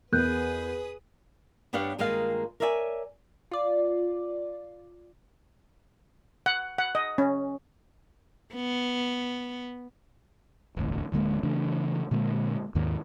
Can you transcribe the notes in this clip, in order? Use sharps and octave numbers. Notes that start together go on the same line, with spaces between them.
E2 G#4 A#4 B4 D#6 F#6 G6
G2 B3 D4 G4 C#5 F5
G2 D#3 G#3 A#3 F4 F5
A#4 C#5 D5 E5 G5 G#5
F4 D5
F#5
F#5
D#5
C#4
B3
E1 A1 D2
D1 D3 G#3 A#3
C#3 E3 A3 D4
A#2 D3 G#3 A#3
D#2 G#2 D#3